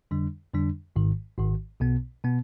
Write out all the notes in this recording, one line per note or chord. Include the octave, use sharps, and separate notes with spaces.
F2 D3 G3 D4
F2 D3 G3 D4
G#1 G#2 D#3
G#1 G#2 D#3
B1 B2 B3
B2 B3